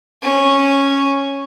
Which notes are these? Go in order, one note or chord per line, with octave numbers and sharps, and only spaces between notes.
C#4